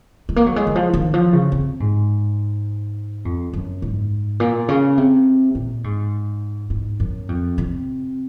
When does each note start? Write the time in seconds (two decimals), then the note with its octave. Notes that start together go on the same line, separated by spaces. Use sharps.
0.29 G#3
0.36 A#3
0.46 F#3
0.56 G#3
0.67 D#3
0.75 F3
0.94 D#3
1.14 F3
1.33 C#3
1.52 C3
1.80 G#2
3.25 F2
3.53 F#2
3.82 G#2
4.40 A#2
4.68 C#3
4.97 C3
5.55 A#2
5.84 G#2
6.70 G#2
7.00 F#2
7.29 F2
7.58 C3